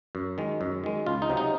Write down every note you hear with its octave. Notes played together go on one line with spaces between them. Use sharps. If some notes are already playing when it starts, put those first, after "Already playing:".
F#2
D#3 G#3
F#2
D#3 G#3
C#2 F4
D#4
C3 F#3
D#4